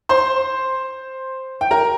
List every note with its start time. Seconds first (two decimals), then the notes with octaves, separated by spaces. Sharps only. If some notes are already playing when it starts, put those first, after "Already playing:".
0.09 C5 C6
1.61 G5
1.71 A#4 A#5